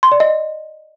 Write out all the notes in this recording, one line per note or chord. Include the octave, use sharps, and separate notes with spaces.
C6
D5
D#5